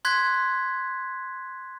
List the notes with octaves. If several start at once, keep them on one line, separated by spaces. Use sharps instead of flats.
C6 F#6 G#6 B6